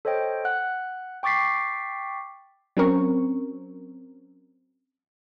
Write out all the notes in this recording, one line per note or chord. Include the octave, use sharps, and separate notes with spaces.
A4 C5 C#5 D#5 G5
F#5 F#6
G5 C#6 D6 A6 B6 C7
F#3 C4 C#4 A#4 C#6